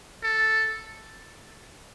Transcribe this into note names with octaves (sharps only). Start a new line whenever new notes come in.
A4